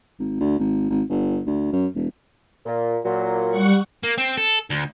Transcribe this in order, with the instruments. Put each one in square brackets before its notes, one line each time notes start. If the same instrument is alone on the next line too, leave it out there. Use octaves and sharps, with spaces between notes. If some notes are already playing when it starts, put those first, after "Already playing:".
[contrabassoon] G#1
D2
G#1
G#1
G1
D2
F#2
E1
[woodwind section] A#2
A#2 F#3
[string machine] G3 F#5 C#6
[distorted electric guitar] A#3
C4
A4
D2